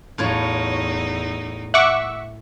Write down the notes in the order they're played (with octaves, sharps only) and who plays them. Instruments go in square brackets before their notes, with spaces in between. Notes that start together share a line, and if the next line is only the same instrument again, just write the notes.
[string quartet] E2 D#4 [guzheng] A2 F4 C#5
[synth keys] E5 [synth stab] F#5 C#6 D6